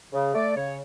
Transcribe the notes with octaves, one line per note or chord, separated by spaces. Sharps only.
C#3
A3 D5
C#3 C#5